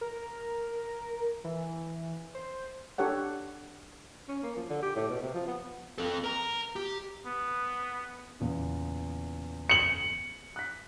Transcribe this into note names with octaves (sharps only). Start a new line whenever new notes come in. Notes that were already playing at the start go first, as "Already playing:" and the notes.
A#4
E3
C5
D4 G4 A4 C#5 F#5
C#4
A#3
F3
D3
G4
A2
B2
C3
F3
B3
C4 A4
A#4 A#5
G4
B3
E2 A#2 C#3
C#7 F#7
F#6 B6